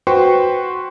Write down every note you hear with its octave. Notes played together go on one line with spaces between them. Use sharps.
F#4 B4 C5 G5 C6 C#6